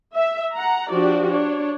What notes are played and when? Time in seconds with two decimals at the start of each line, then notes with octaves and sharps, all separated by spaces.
0.14 E5
0.53 F#5 A#5
0.91 F3 D4 F#4 G4 D5
1.27 D4 C#5